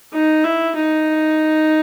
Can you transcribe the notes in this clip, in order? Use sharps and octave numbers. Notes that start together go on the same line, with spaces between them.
D#4
E4
D#4